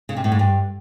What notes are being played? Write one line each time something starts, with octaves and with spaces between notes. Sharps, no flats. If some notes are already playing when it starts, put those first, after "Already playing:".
C#3
C3
A2
G#2
G2